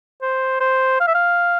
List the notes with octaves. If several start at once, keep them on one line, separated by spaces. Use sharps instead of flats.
C5
C5
F5
E5
F5